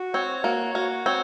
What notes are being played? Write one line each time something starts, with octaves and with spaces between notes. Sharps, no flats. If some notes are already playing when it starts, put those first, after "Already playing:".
Already playing: F#4
C4 C#5
A#3 F#4
A#3 F#4
C4 C#5